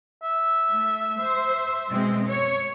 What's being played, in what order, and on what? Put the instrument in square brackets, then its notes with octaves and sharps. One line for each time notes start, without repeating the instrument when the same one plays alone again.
[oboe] E5
[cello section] A3
C5
B2 G#3 C4
C#5